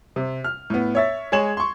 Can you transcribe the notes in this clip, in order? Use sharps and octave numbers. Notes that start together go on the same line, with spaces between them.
C3
F6
A2 B3
C#5 E5 A6
G#3 G#4 C#5 G#6 E7 F#7
C6 C#6